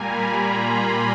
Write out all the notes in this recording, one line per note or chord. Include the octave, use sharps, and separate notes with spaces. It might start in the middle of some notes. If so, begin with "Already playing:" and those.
Already playing: A#2 G3 A#3 G#5 A#5
B5
C6